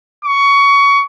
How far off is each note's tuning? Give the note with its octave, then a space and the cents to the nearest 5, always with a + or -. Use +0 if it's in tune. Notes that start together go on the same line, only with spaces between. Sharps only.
C#6 +20